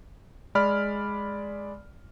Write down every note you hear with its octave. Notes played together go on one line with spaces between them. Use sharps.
G#3 D5 B5 F6